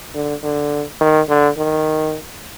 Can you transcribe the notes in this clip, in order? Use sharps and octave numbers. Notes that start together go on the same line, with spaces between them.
D3
D3
D#3
D3
D#3